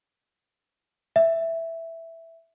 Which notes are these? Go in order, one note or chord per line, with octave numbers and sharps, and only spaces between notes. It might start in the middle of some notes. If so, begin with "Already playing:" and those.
E5